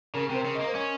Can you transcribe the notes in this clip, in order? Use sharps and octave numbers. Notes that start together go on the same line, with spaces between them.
C#3 A#4
A#4
C3 C5
C#3
A#3 D#5
C5
C#4 C#5